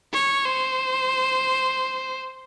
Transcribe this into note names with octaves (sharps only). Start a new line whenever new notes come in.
C#5
C5